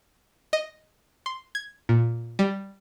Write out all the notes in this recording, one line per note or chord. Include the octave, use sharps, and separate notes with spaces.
D#5
C6
G#6
A#2
G3